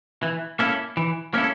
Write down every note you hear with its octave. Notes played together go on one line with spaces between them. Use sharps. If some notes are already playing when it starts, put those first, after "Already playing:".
E3
A#3 C#4 E4 A4
E3
A#3 C#4 E4 A4